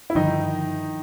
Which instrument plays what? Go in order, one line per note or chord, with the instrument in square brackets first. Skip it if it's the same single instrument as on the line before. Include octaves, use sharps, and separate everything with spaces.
[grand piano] E4
[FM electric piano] G2 D3 F3 [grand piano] D#3 D#4